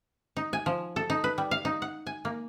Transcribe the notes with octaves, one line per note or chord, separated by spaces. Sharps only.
D#4
G#5
F3
A4
D#4
B4
G3
F5
D#4
F#5
G#5
A#3